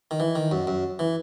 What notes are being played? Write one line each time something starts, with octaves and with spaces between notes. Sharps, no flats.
D#3
E3
D#3
F#2
F#2
E3